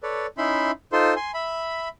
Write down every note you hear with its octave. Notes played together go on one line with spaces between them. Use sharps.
A4 B4 C#5 D5
C#4 D#4 E4 E5 B5 C6
D#4 F4 A4 C5 C6
G#5 C6
E5 B5